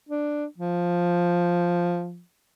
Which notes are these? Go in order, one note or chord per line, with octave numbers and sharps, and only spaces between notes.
D4
F3